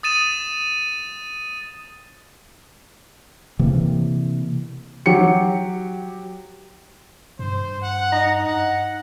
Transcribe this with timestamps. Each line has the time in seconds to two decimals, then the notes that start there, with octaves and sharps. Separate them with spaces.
0.03 D#6 A6 D#7 E7
3.59 C3 E3 A#3
5.06 F#3 G4 C#7
7.39 G2 C5
7.82 F#5
8.12 D#4
8.45 F#5